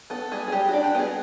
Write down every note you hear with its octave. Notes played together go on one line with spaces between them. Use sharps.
B3 A4
G3 G#4
G#4
G3 G4
D4 F#4
G4
B3 G#4